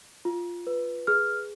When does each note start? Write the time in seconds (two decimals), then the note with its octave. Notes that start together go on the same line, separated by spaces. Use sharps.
0.25 F4
0.67 B4
1.07 G#4 F6